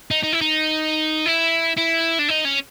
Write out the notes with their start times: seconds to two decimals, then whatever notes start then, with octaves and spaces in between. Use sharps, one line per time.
0.11 D#4
0.23 D#4
0.33 E4
0.41 D#4
1.26 E4
1.77 E4
2.19 D4
2.29 D#4
2.45 C#4